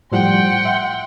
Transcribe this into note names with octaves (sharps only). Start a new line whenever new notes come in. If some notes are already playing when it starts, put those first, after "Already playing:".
A2 F3 G3 F#5 G5 C6
E5